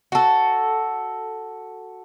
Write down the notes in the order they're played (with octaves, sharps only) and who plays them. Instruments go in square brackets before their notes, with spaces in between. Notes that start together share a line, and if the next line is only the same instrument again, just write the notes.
[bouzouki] F#4 A4